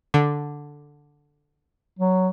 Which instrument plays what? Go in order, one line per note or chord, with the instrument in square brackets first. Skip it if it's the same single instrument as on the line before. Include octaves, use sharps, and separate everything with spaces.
[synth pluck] D3
[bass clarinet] F#3